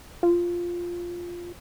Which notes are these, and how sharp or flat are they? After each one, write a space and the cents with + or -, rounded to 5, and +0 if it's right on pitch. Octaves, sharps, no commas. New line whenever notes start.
F4 +0